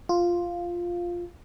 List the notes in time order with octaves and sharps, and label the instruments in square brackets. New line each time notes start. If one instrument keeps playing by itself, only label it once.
[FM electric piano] F4